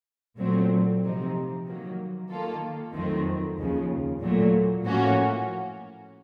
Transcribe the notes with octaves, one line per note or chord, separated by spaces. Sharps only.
A#2 F#3 A3 C4
C3 F3 C4 D#4
D#3 F#3 A#3
D#3 A#3 F4 A4
F2 D#3 F#3 A3 C4
D#2 C#3 F3
A#2 F#3 A3
A2 F3 A#3 C#4 F#4